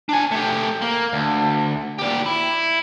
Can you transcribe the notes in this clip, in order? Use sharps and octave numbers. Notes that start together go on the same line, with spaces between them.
D4 G#5
A3 G4
A#3
D2
A#2 G4
E4